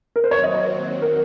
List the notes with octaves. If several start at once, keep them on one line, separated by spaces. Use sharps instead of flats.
A#4
C5
D#2 D#3 F#3 C4 F#4 C#5
D#5
C#5
C5
A#4